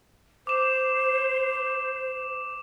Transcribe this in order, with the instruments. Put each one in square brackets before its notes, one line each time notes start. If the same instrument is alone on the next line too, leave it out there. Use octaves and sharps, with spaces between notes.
[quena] C5 [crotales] D6 E7